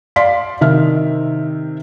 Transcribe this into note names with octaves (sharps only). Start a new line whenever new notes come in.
D5 F5 C6 B6
C3 D#3 E5 F6